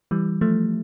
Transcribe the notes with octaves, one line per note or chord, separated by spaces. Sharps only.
E3 G3
F3 A3